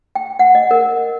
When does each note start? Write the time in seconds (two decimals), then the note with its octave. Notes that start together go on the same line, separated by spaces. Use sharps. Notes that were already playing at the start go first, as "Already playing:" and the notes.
0.15 G5
0.39 F#5
0.55 D#5
0.71 A#4